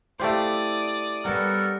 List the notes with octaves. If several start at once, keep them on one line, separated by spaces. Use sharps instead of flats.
A3 E4 G4 B4 C5 D5 F5 D#6
G3 B3 C#4 D4 A4 A#4